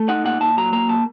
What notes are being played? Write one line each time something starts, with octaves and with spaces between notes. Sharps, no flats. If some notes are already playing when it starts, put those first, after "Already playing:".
Already playing: A3
D#4 F#5
A#2 F#5
A#2 A5
F#3 A#5
A#3 A#5
A#2 A5